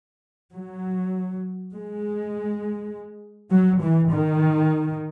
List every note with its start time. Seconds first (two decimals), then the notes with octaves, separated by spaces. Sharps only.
0.55 F#3
1.73 G#3
3.51 F#3
3.81 E3
4.11 D#3